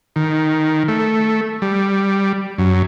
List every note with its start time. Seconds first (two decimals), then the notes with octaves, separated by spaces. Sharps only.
0.16 D#3
0.88 A3
1.62 G3
2.59 F#2